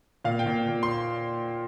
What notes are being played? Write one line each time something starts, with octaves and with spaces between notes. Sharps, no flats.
A#2 F5
G5
A#2
A#2
C6